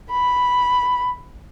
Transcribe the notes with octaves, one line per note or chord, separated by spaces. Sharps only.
B5